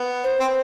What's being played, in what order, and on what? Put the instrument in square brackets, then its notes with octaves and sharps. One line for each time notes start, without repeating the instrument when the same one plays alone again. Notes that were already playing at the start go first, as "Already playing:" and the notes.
Already playing: [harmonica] B3
[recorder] C5
[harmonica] C4